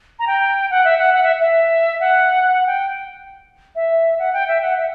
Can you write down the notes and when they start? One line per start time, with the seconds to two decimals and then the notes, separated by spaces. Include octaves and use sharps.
0.19 A#5
0.27 G5
0.70 F#5
0.85 E5
0.99 F#5
1.14 F#5
1.23 E5
1.41 E5
2.00 F#5
2.44 F#5
2.67 G5
3.76 E5
4.19 F#5
4.33 G5
4.48 E5
4.62 F#5
4.77 E5